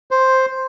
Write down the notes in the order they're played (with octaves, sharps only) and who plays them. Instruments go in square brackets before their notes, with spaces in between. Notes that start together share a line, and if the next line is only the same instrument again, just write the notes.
[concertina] C5